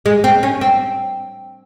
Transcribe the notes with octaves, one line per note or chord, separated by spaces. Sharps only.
G#3
C4
C#4
C4